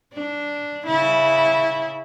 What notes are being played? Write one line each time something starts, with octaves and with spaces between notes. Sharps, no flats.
D4
C#3 E4